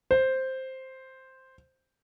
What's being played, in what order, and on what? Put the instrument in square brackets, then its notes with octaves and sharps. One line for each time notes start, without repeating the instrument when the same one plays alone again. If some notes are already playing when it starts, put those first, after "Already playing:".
[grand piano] C5